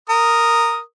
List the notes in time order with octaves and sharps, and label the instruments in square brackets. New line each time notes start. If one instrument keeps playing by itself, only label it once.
[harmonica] A#4 D#6